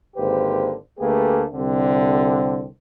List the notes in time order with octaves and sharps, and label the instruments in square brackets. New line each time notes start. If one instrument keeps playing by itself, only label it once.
[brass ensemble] G#1 D3 A#3 G4 B4 C5
D2 A3 A#3 G4 G#4 B4
C2 D3 C4